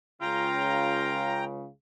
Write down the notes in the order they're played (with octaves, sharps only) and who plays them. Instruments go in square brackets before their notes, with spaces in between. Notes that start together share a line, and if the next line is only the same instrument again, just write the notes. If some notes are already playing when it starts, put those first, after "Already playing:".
[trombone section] C#2 C#3 [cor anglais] F4 [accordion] G5 A#5